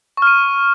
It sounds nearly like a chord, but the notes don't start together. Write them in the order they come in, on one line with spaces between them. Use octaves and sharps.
C#6 F6 D#7